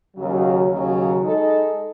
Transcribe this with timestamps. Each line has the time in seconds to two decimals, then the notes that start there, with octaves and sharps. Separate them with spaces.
0.15 D#2 C#3 F#3
0.68 D#2 C#3 F#3
1.23 G#3 D#4 A4 D#5